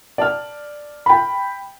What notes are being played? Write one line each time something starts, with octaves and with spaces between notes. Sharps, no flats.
D5 A5 F6
G5 B5